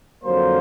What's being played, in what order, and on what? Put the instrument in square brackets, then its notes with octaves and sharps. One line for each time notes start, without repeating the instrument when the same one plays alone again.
[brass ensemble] F2 D3 F#3 A#3 C5